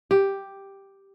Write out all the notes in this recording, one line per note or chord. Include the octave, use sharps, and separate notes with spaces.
G4